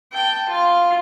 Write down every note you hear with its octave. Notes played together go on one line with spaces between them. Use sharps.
G5 A5
F4 F5